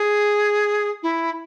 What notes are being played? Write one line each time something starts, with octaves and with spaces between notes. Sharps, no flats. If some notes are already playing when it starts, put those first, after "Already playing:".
Already playing: G#4
E4